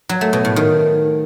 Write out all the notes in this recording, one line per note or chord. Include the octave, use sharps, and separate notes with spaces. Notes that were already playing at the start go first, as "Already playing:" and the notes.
F#3
A3
B2
A2
D#3